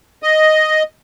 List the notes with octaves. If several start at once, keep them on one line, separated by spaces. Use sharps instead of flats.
D#5